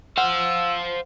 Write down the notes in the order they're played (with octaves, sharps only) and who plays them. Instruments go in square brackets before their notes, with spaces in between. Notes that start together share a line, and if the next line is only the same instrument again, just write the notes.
[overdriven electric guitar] C5 F5 [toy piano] F#5 [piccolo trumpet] E6